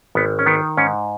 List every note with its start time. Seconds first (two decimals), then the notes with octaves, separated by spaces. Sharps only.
0.15 G#1 B3
0.39 C#4
0.46 D#3 B3
0.77 G#2 C#4